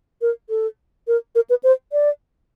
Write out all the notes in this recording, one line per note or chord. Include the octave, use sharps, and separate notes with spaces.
A#4
A4
A#4
A#4
B4
C5
D5